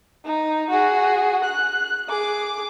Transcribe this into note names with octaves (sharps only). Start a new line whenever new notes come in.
D#4
F#4 G#4
F#6
G#4 D6